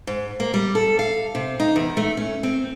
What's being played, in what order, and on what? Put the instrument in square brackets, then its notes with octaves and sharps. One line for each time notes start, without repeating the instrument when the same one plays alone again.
[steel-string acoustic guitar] G#2
A#3
G3
A4
F5
C3
D#4
E2
A3
C#4
C4